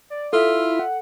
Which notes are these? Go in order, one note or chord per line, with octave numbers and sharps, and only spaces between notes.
D5
E4 F4 A4 E5
F#5